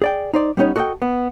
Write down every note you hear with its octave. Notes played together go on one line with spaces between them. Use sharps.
G#4 D5 G5
D#4 C5 D5
G3 B3 C#4 D#4 C#5
F#4 A4 D#5 F#5 G5
B3